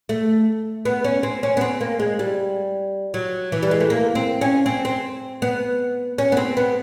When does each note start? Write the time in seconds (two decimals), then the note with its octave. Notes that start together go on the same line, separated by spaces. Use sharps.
0.09 A3
0.85 B3
1.04 C#4
1.23 C4
1.43 C#4
1.57 B3
1.61 C4
1.81 A#3
2.00 G#3
2.19 G3
3.14 F#3
3.52 E3
3.63 G3
3.71 G#3
3.80 A3
3.90 A#3
4.15 C4
4.41 C#4
4.66 C4
4.85 C4
5.42 B3
6.18 C#4
6.32 B3
6.37 C4
6.57 B3